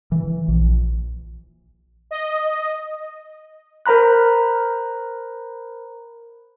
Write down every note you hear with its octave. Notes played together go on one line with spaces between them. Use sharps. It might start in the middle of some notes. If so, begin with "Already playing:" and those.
E3
A#1
D#5
A#4 C5 A#5 B5 F#6